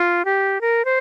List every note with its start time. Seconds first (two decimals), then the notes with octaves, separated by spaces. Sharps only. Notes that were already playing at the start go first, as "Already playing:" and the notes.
Already playing: F4
0.25 G4
0.61 A#4
0.85 C5